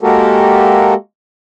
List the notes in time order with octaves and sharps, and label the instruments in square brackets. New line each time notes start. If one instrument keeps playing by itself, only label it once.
[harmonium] G#3 A#3 F#4 G4 A4 A#4